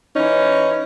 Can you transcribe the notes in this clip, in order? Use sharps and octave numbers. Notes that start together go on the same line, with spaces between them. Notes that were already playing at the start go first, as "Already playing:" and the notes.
E3 C#4 D#4